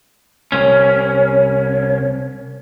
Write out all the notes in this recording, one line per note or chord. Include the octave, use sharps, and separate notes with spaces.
C2 C#4